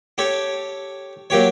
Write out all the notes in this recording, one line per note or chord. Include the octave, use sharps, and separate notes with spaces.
G4 A4 C#5
F#3 A#3 G4 C#5